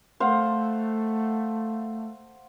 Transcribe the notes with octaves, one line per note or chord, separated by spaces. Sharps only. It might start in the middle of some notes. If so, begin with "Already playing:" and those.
A3 C5 F5 F#5